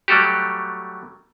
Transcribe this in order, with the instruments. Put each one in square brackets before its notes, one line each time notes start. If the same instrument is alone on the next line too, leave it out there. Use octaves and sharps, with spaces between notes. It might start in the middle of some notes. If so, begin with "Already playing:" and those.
[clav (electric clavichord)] F#3 G3 A3 F#4 G4